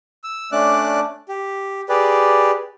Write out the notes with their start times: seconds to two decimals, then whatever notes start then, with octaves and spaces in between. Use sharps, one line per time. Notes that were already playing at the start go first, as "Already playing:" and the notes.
0.24 E6
0.52 A3 C#4 D4 D5 D6 F#6
1.29 G4
1.89 G4 G#4 B4 D5